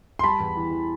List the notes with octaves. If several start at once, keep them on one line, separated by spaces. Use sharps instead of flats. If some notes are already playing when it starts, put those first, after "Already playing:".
C6
G3 A5 B5
E2
E3
E3